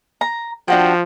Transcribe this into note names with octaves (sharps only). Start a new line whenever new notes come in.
A#5
F3 D4 F#4 G5